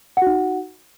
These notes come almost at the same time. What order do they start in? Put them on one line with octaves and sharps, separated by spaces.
F#5 F#4 D#4